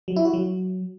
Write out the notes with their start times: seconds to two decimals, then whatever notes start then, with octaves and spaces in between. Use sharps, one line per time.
0.08 F#3
0.16 E4
0.25 F#4
0.33 F#3